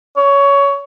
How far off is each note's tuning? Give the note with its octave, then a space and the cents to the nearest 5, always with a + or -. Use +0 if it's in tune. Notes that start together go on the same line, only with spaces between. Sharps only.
C#5 +15